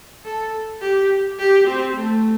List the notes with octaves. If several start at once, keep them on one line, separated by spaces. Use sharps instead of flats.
A4
G4
G4
C4
A3